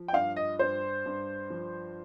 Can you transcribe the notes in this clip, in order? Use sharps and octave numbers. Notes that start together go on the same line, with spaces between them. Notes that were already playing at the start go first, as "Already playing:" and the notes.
Already playing: F3
G5
G2 F5
D#5
G2 C5
G2
F3